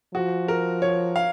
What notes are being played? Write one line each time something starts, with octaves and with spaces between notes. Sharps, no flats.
F3 F#4
A#4
C#5
F5